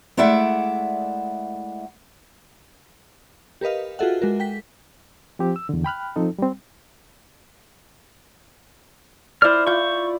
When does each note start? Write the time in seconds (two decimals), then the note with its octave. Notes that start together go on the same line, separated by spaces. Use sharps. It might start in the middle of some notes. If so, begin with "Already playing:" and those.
0.17 G#3 A3 E4 D5 E5 F#5
3.61 G4 A#4 B4 D#5 F5
3.99 F4 F#4 G#4 A4 E5 F#5
4.22 G#3 F#4 A#4
4.40 G5 B6
5.39 F3 C4 G4
5.56 E6
5.69 E2 D3
5.84 G5 B5 F6 F#6
6.16 F3 C4 D#4 A4
6.39 G3 C4
9.42 E4 C5 D5 F6
9.67 E4 F4 C#6 D6 G6